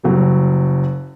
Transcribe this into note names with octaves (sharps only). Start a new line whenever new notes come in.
F#1 F#3 G3